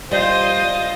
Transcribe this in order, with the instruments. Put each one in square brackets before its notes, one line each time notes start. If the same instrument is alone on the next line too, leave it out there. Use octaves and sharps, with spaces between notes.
[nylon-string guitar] G3 [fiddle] F4 D#5 [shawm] C5